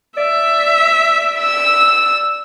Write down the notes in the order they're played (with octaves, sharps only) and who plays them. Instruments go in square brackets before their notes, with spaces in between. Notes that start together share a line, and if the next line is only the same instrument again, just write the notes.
[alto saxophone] D5 [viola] E5
[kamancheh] E6